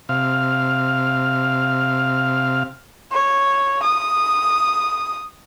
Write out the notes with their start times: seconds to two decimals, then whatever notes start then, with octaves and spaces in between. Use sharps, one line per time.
0.09 C3 F5
3.12 C#5
3.83 D#6